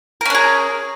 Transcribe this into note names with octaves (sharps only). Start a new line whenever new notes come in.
C#4 D4 G#4 A#4